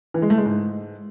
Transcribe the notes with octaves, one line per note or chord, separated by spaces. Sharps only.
E3
G#3
A3
G#3
G#2